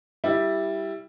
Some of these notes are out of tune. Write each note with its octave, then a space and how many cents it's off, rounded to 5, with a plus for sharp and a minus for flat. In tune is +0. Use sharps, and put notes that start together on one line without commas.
G3 +0 E4 +0